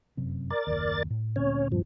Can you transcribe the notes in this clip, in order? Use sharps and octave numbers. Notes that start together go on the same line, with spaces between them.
F1 F#2 C3
A#4 D5 A6
F#1 D#2
A2
D2 A#2 C4 C#4 C#5
G2 F3